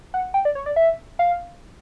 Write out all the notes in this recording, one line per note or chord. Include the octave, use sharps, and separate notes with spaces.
F#5
G5
D5
C#5
D5
E5
F5